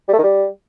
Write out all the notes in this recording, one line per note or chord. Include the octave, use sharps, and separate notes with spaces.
G3
A3
D#3
G3